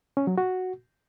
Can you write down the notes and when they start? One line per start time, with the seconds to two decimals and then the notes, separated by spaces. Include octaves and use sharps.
0.17 C#4
0.27 F#3
0.38 F#4